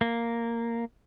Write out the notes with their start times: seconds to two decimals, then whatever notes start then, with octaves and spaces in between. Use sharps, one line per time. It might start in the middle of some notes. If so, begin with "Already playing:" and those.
0.01 A#3